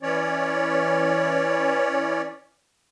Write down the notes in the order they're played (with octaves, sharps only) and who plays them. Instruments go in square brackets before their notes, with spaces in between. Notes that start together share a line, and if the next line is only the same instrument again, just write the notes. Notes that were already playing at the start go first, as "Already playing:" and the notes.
[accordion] E3 C#4 C#5 D5